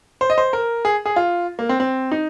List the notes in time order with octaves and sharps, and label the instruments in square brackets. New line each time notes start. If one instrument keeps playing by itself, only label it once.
[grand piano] C5
D#5
C5
A#4
G#4
G#4
F4
A#3
C4
C4
D#4